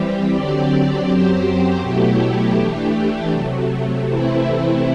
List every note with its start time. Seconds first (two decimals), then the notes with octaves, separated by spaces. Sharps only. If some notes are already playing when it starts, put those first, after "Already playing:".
Already playing: E3 G3 C4 G4
0.31 D3 F#3 C4 G4 D5
1.06 F#2 F#3 C4 G4 C5
1.81 B2 F#3 A3 E4 G4
2.56 E3 A3 D4 G4
3.31 C3 F#3 A3
4.07 C3 E3 A3 C4 E4